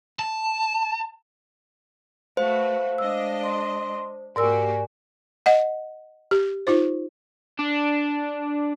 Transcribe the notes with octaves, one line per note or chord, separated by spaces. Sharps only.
A5
A3 F#4 B4 C5 F5
G#3 D4 D#5 E6
C6
G#2 A#3 F#4 G4 A#4 D5 G#5 E6
D#5 F#5
G4
D#4 F4 C5
D4